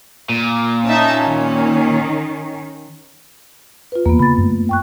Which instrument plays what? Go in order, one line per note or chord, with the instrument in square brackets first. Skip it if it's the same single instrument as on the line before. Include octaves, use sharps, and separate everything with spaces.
[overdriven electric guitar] A#2
[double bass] C#4 [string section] D#4 E5 A5
[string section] D#3
[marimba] F4 B4
[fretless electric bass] E2 [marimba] A#3 B3
[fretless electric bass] C#3 [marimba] B5 A6
[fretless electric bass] F#2 A3
[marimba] G5 C#6 F#6